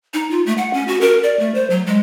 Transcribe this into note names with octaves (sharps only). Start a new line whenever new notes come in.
D#4
F4
A3
F#5
C#4
F#4
A#4
D5
A3
C5
F#3
G#3